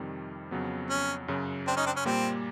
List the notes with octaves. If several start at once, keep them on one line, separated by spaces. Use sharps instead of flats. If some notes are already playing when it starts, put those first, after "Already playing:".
Already playing: F2 C3 D#3 G3
F2 C#3 F#3 B3
C#4
F#2 C#3 F#3
C4 D4
C#4 D#4
C4 D4
C#4
A#2 G3 A#3 C4